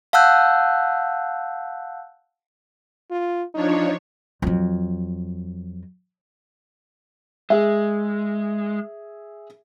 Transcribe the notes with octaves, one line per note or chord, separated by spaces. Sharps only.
F5 F#5 A5 E6 F#6 G6
F4
F3 D4 D#4 C#5
F2 F#3
G#3 G#4 E5